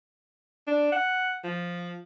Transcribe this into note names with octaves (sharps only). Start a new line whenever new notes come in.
D4
F#5
F3